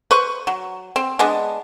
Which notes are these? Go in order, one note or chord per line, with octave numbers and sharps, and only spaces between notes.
B4 C5 C#6
F#3
C4
G#3 B3 D4